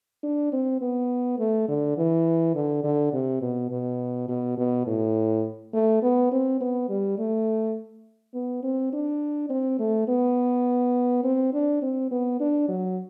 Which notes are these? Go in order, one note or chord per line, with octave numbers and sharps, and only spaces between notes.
D4
C4
B3
A3
D3
E3
D3
D3
C3
B2
B2
B2
B2
A2
A3
B3
C4
B3
G3
A3
B3
C4
D4
C4
A3
B3
C4
D4
C4
B3
D4
F#3